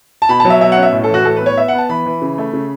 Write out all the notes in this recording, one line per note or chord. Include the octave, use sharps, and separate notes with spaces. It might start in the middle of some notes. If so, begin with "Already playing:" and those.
A5
B2 B5
F#3 A5
E5
B2 E5
F#5
C#4
E5
A2
A4
E3
F#4
A2 A4
B3 B4
C#5
B3 E5
B3 F#5
A5
E3 B5
E3
C#3
A3
C#3